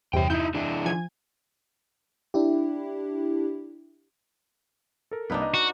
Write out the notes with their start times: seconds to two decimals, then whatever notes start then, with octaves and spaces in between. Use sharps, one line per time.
0.13 E2 G2 C3 C#5 G5
0.30 D#4 E4 G6
0.55 E3 D4 E4
0.86 F3 G#5 G#6
2.34 D4 E4 G4
5.11 A4 A#4
5.30 C2 A#3 D4 D#4 B4
5.42 D#5
5.54 F#4